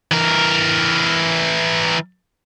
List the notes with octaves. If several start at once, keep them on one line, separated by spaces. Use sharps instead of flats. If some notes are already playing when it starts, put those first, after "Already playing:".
E3 A#4